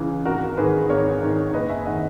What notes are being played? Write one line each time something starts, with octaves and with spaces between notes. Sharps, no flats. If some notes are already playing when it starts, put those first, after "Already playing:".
Already playing: C#2 C#3 E3
G#1 F#4 A#4
A#4
G#2 D#3 G#4 B4
G#1 A#4 C#5
G#2 D#3
F#1 B4 D#5
E5 G#5
D#3 D#5 F#5